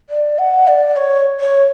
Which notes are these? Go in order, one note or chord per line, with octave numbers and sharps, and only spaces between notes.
D5
F#5
D5
C#5
C#5